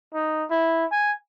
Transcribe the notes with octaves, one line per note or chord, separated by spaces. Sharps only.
D#4
E4
G#5